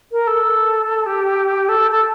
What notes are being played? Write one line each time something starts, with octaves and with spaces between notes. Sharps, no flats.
A#4
A4
G4
A4
A4